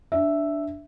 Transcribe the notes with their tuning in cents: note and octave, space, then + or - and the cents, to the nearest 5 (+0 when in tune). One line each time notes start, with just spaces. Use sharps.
D4 +0 E5 +0